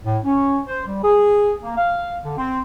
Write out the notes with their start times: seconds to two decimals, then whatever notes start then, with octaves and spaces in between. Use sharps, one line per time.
0.05 A2
0.25 C#4
0.67 C5
0.86 G3
1.03 G#4
1.63 A#3
1.77 F5
2.24 D3
2.38 C4